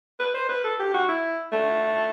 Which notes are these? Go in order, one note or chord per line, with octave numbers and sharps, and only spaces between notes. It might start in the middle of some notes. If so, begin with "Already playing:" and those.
B4
C5
B4
A4
G4
F#4
E4
A3